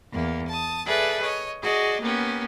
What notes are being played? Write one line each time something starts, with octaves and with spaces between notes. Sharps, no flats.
E2 A#3
A5 D#6
G#4 A4 B4 D5 E5
C#5 D#5
F#4 G#4 D5 D#5
A#3 B3 C#4 G4